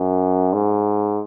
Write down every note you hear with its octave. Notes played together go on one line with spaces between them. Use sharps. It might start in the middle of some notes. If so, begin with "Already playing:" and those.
Already playing: F#2
G#2